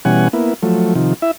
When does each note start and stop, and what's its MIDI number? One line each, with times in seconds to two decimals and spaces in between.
0.05 0.28 47
0.05 0.28 52
0.05 0.28 55
0.05 0.28 61
0.05 0.28 78
0.05 0.28 80
0.33 0.54 58
0.33 0.54 59
0.33 0.54 64
0.63 0.94 53
0.63 0.94 54
0.63 0.94 57
0.95 1.14 48
0.95 1.14 51
0.95 1.14 53
1.22 1.31 64
1.22 1.31 76